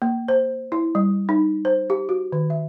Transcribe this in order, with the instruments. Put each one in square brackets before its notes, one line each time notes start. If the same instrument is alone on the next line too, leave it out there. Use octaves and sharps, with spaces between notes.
[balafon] A#3
C5
E4
G3
D#4
C5
G4
F#4
D#3
E5